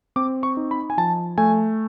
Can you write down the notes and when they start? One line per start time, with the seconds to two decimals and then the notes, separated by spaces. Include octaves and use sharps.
0.16 C4 D6
0.43 C#6
0.57 D#4
0.71 B5
0.90 G#5
0.97 F3 A5
1.38 A3 G#5